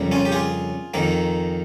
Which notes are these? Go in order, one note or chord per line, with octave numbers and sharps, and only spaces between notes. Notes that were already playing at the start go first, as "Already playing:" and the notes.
Already playing: F2 C#3 G3 A#3
C#4 F4
G4
F4 G#4
F2 D#3 A#3